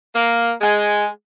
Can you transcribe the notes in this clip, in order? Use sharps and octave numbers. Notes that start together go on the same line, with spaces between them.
A#3
G#3